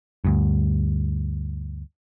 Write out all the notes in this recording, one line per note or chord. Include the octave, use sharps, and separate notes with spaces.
D2 G2